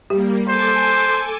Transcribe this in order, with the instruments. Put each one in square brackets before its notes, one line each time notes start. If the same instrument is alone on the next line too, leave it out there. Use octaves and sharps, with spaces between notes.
[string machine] G3 A#3 [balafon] G4
[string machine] A4 G#5 D6 [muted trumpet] C5